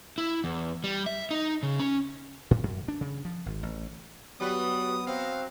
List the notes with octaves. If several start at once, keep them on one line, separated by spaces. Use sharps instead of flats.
E4
E2
G3
E5
D#4
C#3
C#4
A2
F#2
D4
C#3
F3
G#1
A1
F#3 G3 B3 B4 D#6
F#3 C4 F5